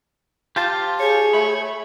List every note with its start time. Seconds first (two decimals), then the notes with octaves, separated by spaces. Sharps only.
0.56 F4 G4 C5 A5
1.00 G#4 C#5
1.33 A3 B5